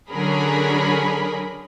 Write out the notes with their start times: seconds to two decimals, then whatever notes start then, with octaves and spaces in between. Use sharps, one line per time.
0.10 D3 F#3 C#4 G#4 A#4 B5